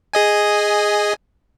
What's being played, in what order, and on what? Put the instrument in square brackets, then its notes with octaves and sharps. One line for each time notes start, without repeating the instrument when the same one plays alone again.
[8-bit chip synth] G#4 D#5 G#5